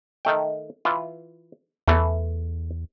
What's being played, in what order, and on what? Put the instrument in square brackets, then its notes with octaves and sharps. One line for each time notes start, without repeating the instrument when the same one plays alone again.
[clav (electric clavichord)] D#3 A3 G5
E3 F4
[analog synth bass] E2 [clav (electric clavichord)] E3 A3